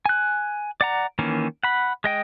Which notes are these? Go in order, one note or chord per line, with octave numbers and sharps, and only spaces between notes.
G#5 F#6
D5 F#5 A#5
D#3 E3 A#3 C#4
F#5 B5
G#3 D#5 G5